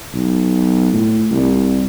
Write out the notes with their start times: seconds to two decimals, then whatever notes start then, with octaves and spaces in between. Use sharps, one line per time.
0.14 B1
0.93 A2
1.32 C2